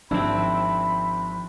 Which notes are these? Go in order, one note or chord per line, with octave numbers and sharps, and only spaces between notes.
G#1 F3 C4 D4 E4 B5